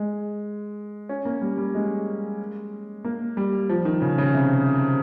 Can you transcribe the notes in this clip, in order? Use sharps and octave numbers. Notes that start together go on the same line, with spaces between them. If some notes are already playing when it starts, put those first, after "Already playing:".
Already playing: G#3
C#4
A#3
G3
G3
G#3
A#3
G3
F3
D#3
C#3
C#3
C3